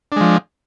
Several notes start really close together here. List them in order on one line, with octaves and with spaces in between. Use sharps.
D4 G#3 F3